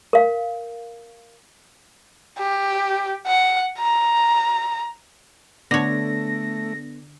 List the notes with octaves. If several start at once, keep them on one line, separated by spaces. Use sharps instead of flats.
A#4 F5
G4
F#5
A#5
D3 A3 B3 D4 A4 C#5 A#6